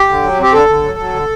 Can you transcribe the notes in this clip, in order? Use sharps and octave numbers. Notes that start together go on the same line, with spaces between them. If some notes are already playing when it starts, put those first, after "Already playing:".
Already playing: G4
D3
F#3
C4 G4
D3 A4
D3
F#3
F#3
D3